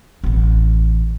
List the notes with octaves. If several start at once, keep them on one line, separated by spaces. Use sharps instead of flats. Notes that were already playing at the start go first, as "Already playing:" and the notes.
A1 B3